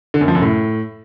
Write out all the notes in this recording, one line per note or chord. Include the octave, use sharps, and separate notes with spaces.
D3
F#2
F3
F#2
A2